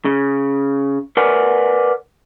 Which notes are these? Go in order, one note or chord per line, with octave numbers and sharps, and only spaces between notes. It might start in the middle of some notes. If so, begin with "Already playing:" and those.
C#3
A#4 B4 D5 F#5 G#5